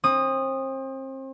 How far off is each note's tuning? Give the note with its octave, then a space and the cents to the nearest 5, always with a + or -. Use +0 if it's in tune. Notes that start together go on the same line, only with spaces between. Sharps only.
C4 +35 D#6 -10